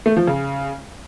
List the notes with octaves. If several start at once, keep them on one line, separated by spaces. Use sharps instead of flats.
A3
F3
C#3